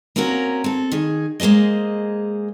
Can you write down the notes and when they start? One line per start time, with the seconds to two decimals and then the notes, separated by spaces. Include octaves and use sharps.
0.16 A#3 C4 C#4 F#4 A#4
0.64 C4 A4
0.92 D#3 G#4
1.40 G#3 A#3 G#4 C5 D#5